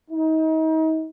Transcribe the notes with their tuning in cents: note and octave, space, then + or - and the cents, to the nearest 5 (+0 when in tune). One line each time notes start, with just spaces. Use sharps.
D#4 +35